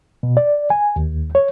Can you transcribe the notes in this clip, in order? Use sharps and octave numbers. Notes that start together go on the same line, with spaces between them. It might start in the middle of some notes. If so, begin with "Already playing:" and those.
B2
D5
G#5
D#2
C#5